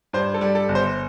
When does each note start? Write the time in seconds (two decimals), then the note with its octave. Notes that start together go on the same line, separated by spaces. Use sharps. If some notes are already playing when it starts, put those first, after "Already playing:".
0.13 G2 C5
0.34 A4
0.41 G3
0.55 A4
0.69 G1
0.75 C5